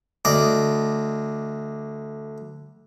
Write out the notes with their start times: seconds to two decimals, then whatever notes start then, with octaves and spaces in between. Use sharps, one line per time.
0.25 D2 D5 D#5